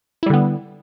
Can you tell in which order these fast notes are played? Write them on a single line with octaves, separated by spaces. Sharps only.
E4 G3 D3 B3